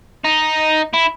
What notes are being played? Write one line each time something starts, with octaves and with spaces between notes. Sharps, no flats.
D#4
E4